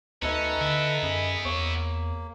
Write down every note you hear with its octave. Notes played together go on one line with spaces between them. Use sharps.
D2 C#4 D#4 A4 B4 E5 A5 A#5
D3 B3 E4
F#2 G#4 B5
E2 A#3 C#5